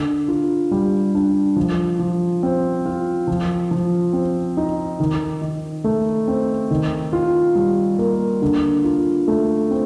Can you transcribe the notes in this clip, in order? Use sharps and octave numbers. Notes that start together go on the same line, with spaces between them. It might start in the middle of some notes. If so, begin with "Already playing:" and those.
Already playing: D3
F4
G3
D4
F3
F3
C4
F4
F3
F3
C4
D#4
D#3
D#3
A3
C4
D#3
F4
G3
A#3
D3
F4
A3
C4